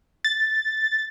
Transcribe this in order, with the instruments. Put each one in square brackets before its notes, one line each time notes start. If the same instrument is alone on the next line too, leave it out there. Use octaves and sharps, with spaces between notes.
[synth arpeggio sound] A6